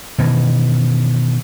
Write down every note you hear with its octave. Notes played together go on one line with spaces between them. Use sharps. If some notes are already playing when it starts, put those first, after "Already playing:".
B2 D#3 E3